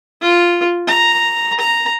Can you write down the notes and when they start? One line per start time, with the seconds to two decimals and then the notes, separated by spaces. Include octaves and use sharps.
0.22 F4
0.87 A#5
1.59 A#5